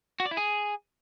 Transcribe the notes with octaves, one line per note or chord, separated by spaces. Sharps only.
F#4
D5
E4
G#4